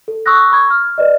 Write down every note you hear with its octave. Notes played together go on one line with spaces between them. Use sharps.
A4
C#6 D#6 E6 F#6 A#6
B5 C#6 G#6
F6
B4 D5 D#5